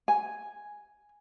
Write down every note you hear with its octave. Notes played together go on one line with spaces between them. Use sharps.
G#5